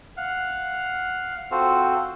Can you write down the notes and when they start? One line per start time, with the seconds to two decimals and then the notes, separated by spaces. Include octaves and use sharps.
0.17 F5 F#5
1.51 C4 F4 F#4 A4 C5